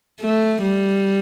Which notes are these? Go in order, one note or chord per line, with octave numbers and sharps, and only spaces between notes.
A3
G3